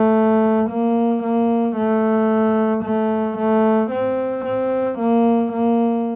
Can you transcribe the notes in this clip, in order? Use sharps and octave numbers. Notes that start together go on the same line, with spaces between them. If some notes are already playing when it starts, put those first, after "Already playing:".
Already playing: A3
A#3
A#3
A3
A3
A3
C4
C4
A#3
A#3